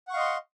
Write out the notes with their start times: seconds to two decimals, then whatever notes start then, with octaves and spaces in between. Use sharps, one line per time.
0.07 F#5
0.10 C#6
0.13 F5
0.16 D#5
0.19 C6